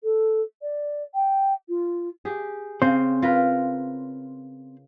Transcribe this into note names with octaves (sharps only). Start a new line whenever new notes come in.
A4
D5
G5
F4
G4 G#4
C#3 C4 C5
F4 A#4 B4